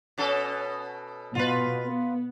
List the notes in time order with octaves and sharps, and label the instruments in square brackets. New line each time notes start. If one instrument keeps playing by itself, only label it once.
[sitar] B2 C#4 A4
[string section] B2 [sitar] F4 B4
[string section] B3